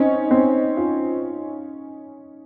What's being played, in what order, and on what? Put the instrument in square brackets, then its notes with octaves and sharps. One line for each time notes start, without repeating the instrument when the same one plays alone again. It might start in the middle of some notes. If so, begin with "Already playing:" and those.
Already playing: [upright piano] C4 [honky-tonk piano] C#4 D#4
[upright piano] C4
F4